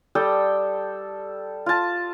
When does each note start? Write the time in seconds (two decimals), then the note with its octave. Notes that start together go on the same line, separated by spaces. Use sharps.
0.15 G3 A4 G5 D#6
1.66 F4 A5